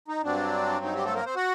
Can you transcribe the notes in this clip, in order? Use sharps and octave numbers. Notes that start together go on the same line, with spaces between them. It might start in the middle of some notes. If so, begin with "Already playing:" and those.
D#4
G2 F#3 C4 D4
D#4
G3 G4
A3 A4
A#3 A#4
C4 C5
F#4 F#5